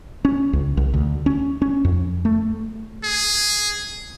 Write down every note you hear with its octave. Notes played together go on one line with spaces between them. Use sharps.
C#4
C#2
C2
D2
C#4
C#4
F2
A3
G#4